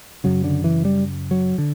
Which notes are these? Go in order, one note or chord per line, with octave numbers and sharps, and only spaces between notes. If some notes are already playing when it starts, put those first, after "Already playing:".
F#2 C#3 F#3
D3
E3
G3
F#3
D3